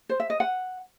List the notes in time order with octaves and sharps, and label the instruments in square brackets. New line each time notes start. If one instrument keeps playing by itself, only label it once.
[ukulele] C5
E5
D#5
F#5